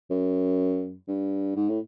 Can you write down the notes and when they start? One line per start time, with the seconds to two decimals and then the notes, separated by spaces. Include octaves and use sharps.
0.10 F#2
1.07 G2
1.56 G#2
1.69 A2